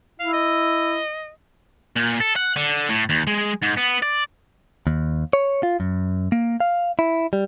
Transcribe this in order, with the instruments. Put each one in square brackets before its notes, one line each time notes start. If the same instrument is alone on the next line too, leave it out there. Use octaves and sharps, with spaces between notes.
[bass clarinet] E4 [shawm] F5
[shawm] D#5
[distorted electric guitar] A#2
A4
F#5
D3
A2
D#2
G#3
G#2
B3
D5
[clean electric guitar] D#2
C#5
F4
F#2
A#3
F5
E4
G3